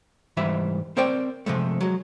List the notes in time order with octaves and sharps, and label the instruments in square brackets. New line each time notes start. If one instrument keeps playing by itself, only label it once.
[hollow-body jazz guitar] G#2 E3 G3 E5
C4 A#4 C5 D5 G5
C3 F3 G#3 A3
F#3 G#3